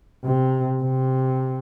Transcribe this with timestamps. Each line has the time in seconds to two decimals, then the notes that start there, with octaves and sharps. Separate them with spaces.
0.24 C3
0.83 C3